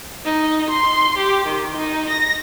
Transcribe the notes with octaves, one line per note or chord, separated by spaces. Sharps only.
D#4
C6
G4
D#3
D#4
A#6